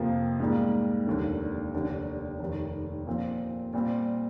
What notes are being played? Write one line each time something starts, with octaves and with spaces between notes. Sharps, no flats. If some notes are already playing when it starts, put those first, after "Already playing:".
Already playing: F2 C3 F3 A#3
G#2 G3 A#3
F1 D#2 D3
F1 D#2 D3
F1 D#2 D#3
A#2 F3 C4
A#2 G3 C4